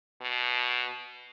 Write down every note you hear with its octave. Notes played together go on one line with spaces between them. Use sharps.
B2